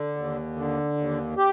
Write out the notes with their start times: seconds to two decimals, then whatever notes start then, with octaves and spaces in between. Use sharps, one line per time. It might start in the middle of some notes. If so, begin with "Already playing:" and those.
Already playing: D3
0.16 D#2
0.56 D3
0.97 D#2
1.37 G4